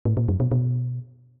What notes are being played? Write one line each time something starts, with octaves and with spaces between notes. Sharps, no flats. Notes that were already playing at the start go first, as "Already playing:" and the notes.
A2
A#2
F#2
B2
B2